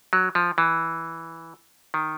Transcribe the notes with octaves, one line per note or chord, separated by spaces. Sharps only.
F#3
F3
E3
D#3